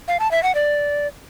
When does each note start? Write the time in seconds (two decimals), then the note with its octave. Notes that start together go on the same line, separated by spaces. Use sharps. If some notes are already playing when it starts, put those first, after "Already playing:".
0.08 F5
0.20 A5
0.32 E5
0.43 F#5
0.55 D5